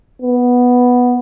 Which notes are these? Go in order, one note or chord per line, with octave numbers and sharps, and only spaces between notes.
B3